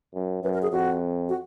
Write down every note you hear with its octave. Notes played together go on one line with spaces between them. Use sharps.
F#2
F#2 B4
A#4
G#4
F2 F#4
F#4